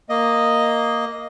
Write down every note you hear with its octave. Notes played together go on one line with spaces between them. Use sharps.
A#3 D#5